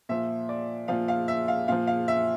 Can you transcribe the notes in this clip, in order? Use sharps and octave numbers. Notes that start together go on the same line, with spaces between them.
A#2 F3 E5
D5
A#2 F3 F5
F5
E5
F5
A#2 F3 F5
F5
E5